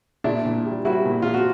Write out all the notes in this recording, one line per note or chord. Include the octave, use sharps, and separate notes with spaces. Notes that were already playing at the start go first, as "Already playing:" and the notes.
A#2 D4 E4
A#2
G3
G3 E4 F#4
A#2
A#2 F4
F#4